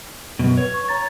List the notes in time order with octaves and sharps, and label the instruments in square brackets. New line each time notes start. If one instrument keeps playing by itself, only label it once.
[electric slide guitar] F#2 B2
[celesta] B4 [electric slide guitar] C#5
[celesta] C#6
A#5 A6